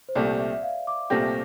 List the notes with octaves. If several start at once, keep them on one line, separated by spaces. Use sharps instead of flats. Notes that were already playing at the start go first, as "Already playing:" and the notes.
C5
C2 A#2 A3 C4 G4 D5
E5
E5
F5
D6
C2 A#2 A3 C4 G4 A#6